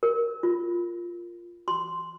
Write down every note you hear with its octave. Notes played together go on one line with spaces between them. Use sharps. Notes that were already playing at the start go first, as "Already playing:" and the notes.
A#4
F4
C6